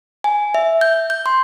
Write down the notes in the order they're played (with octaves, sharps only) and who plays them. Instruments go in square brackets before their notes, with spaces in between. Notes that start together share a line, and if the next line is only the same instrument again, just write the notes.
[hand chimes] G#5
E5
G6
G6
C6